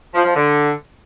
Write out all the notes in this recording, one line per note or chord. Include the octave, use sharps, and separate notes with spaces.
F3
F3
D3